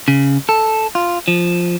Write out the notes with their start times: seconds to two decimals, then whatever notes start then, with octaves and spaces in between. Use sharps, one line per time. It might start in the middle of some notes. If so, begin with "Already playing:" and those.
0.08 C#3
0.49 A4
0.95 F4
1.28 F3